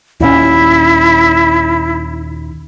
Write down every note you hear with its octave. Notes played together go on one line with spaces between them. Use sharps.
D#2 A#2 C#4 E4